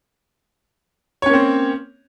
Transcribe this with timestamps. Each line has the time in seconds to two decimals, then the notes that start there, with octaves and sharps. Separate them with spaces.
1.22 C#5
1.26 C#4
1.30 A#3
1.33 C4